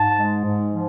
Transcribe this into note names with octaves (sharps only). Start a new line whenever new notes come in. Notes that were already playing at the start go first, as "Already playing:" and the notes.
Already playing: G#2 A5
G#3
G#2
F3